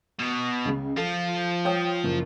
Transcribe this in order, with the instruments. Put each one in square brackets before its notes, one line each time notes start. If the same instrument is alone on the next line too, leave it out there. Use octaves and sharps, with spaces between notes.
[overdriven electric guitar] B2
[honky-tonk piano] C#2 C#3
[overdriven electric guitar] F3 F4 [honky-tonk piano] A4
[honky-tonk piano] C#5 G5 D#6
F#1